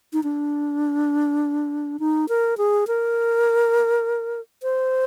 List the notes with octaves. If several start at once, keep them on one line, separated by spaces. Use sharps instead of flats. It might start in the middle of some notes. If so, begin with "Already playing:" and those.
D#4
D4
D#4
A#4
G#4
A#4
C5